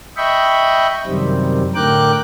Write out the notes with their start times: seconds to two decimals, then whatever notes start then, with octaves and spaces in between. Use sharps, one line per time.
0.17 D#5 E5 G5 B5 C#6
1.07 F#2 C3 D#3 G3 C4
1.75 A2 D3 A#4 G5 D6 F#6